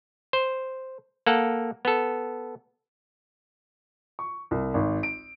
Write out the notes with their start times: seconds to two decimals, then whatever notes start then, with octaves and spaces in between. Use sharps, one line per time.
0.33 C5
1.27 A#3 A4 F#5
1.85 B3 A4
4.19 C#6
4.51 C2
4.74 G#1
5.03 D7